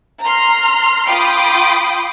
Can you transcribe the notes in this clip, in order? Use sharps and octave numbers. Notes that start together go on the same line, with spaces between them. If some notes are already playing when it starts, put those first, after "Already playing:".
A#5 C6 F6
F4 G5 B5 C6 D6 D#6